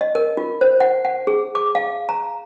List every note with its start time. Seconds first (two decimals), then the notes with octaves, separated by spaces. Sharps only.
0.01 D#5
0.15 A#4
0.37 F4
0.61 C5
0.80 F#5
1.05 F#5
1.27 G#4
1.55 D6
1.75 F5
2.09 A#5